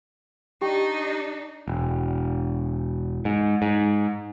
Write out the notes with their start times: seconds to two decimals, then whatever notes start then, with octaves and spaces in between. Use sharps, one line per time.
0.62 D4 D#4 G4 G5
1.68 E1
3.25 G#2
3.62 G#2